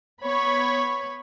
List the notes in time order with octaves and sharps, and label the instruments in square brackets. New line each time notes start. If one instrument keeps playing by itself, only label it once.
[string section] B3 C#5 B5